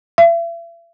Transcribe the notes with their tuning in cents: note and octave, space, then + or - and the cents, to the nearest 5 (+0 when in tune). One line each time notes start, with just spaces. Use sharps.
E5 +40